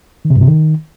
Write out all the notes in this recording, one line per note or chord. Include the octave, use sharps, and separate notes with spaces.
D#3
C3
G2
C3
D#3